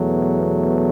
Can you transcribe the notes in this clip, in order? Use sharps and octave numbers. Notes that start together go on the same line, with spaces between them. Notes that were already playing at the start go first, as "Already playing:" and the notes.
Already playing: E2 B2 F#3 A3